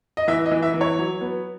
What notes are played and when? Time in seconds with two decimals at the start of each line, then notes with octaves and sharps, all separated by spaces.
0.17 D#5
0.28 E3 E5
0.46 D#5
0.51 E3
0.63 E5
0.74 E3
0.81 C#5
0.98 F#3
1.21 B3